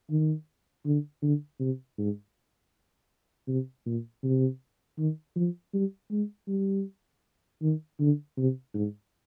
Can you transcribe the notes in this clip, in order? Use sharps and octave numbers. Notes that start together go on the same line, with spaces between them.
D#3
D3
D3
C3
G#2
C3
A#2
C3
D#3
F3
G3
G#3
G3
D#3
D3
C3
G#2